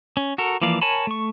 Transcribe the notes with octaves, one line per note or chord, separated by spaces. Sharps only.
C#4
F#4 A4 A#4
E3 F3 A#3 D5 F5
A#4 C#5 G#5 A5 B5
A3 C#6